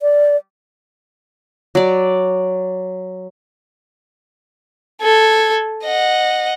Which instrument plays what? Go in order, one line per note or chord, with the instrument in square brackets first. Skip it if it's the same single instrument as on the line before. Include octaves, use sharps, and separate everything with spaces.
[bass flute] D5
[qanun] F#3 D5
[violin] A4 G#6
D#5 F#5